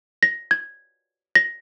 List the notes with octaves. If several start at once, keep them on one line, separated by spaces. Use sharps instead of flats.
A#6
G#6
A#6